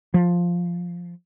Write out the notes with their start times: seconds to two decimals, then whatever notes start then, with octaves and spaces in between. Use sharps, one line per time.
0.14 F3